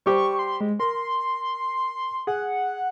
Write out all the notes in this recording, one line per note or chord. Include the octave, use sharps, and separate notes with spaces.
G3 G4 C5 C#6
C6
G#3
A#4 C6
G#4 F#5